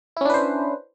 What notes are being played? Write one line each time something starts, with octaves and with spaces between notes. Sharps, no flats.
C#4 D4 E4 B4 C5